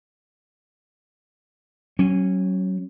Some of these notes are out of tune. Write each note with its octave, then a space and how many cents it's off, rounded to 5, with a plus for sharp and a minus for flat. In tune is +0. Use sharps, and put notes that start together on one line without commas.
F#3 +25 C#4 -20